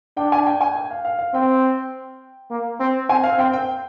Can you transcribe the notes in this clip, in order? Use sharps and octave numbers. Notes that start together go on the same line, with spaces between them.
D4 G5
G#5
G5
G#5
G5
F5
F5
F5
C4 G5
A#3
C4
C4 G#5
F5
C4 G5
G5